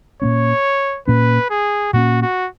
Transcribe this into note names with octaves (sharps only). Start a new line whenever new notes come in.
A#2 A#3 C#4 C#5
A#2 A#3 C#4 B4
G#4
A#2 A#3 C#4 F#4
F#4